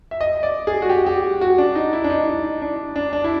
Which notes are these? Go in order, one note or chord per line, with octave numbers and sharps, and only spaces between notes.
E5
D#5
D5
G#4
F#4
G4
G4
F#4
D4
D#4
E4
D4
D#4
D#4
D4
D4
D4
E4